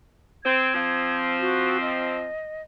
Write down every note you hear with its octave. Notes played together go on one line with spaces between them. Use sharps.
C4 G#6
F3 C4
F#4
D#5